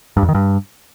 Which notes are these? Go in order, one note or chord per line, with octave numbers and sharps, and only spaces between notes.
G2
F2
D#3
G2